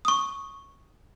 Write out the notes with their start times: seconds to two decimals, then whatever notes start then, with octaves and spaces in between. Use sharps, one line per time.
0.05 C#6 D#6